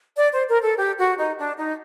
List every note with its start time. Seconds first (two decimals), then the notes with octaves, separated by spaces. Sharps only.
0.17 D5
0.33 C5
0.48 A#4
0.63 A4
0.77 G4
0.98 F#4
1.17 D#4
1.37 D4
1.58 D#4